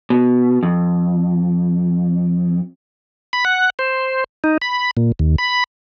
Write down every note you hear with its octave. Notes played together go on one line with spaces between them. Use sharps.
B2
F2
B5
F#5
C5
D#4
B5
A#2
D#2
B5